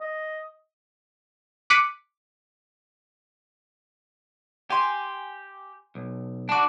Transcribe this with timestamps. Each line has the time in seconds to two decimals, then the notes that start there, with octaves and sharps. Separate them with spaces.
0.01 D#5
1.70 D6 F#6 B6 C#7 D#7
4.70 G4 G#5 C6
5.95 B1
6.49 D4 F#4 A5 D6